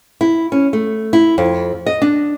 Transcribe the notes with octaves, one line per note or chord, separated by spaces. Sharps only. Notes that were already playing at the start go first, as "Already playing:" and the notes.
E4
C#4
A3
E4
F2
D#5
D4